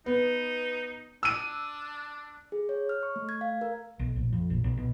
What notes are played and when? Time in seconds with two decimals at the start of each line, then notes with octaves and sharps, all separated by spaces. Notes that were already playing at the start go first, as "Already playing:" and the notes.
0.06 B3 D#4
1.23 D4 E6 D#7
2.52 G#4
2.69 C#5
2.89 F6
3.03 C#6
3.16 A3
3.29 G#6
3.41 F5
3.61 A#4
3.99 B1
4.16 A#1
4.32 F2
4.50 A#1
4.64 B1
4.77 B2